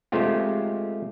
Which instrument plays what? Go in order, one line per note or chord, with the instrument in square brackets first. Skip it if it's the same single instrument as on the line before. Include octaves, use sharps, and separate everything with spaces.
[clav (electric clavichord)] G#3 A3 C4 F4 G4